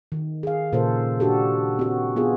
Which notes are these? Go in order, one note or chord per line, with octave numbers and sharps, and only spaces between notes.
D#3
G#4 F5
A#2 C#3 A4 A#4 C5
D4 F#4 G4 A4
C4 F#4
B3 F4 G#4